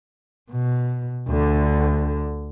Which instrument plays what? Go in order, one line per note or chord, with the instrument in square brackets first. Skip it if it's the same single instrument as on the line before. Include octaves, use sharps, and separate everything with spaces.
[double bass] B2
D2 D3